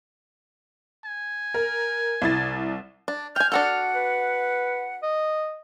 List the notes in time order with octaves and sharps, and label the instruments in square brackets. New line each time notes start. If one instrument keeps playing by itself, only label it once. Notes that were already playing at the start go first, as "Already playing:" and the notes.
[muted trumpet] G#5
[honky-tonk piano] A#4
C2 E4 A6
[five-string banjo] D4
[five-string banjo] G5 G#5 [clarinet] F6 [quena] G6
[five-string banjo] D4 F#4 A4 [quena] F#5
[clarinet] B4
D#5